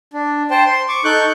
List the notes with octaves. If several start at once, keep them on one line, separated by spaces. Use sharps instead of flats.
D4
C5 G5 A5
C6
C#6 D6
D#4 A4 C#6 F#6 G6